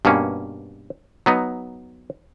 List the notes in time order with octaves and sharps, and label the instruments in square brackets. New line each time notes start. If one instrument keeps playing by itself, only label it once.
[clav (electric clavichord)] G2 B2 A#3 C#4
F#3 B3 D#4